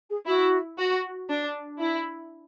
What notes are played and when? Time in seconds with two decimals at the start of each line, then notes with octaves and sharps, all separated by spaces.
0.10 G#4
0.27 E4 F#4
0.78 F#4
1.30 D4
1.81 E4